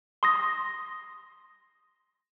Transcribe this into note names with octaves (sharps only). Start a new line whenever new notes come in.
C6 D#6 A#6